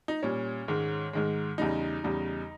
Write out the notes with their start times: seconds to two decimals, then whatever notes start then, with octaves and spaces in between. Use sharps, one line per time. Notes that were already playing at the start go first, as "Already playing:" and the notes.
0.08 D#4
0.23 A#2 G3 C#4
0.68 G#2 D#3 G#3
1.13 G#2 D#3 G#3
1.58 E2 C#3 G3 D#4
2.04 E2 C#3 G3